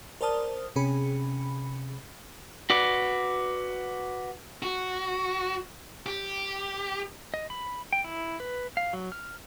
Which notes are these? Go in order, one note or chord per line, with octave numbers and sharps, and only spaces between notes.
A#4 C5 D5 A5 D#6 F6
C3 C#4 G#4 B5 C#7
F#4 B4 D5
F#4
G4
D#5
B5
G5
E4
B4
F5
F#3
F6